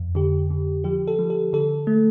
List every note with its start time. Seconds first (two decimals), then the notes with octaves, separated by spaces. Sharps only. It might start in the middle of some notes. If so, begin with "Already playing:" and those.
Already playing: F2
0.15 D3 G4
0.50 D3
0.84 F3 G4
1.08 A4
1.19 F3
1.30 A4
1.53 D3 A4
1.87 A3